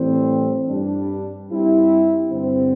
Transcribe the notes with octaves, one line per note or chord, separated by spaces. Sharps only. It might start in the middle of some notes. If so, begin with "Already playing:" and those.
Already playing: A2 E3 G3 C4
G2 G3 D4
G2 G3 C4 E4
G2 D3 C4